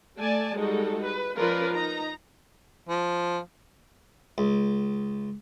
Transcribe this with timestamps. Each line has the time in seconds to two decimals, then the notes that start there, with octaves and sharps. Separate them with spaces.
0.18 A3 D5 G#5 A5
0.56 G3 G#3 D#4 F#4 A4
1.03 B4
1.37 F3 C#4 F4 A#4 B4 D5
1.73 D#4 A#5
2.89 F3
4.38 C#2